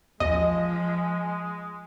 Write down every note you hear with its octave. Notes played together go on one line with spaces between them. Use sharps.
A1 D#2 F3 G#3 D#5